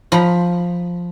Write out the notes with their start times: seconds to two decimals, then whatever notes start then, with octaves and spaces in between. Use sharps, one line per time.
0.12 F3 A#5 B5